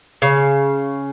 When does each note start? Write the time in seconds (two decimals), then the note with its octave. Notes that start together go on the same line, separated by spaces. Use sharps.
0.22 C#3